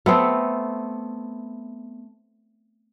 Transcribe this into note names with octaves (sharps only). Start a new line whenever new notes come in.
A3 B3 C4 A4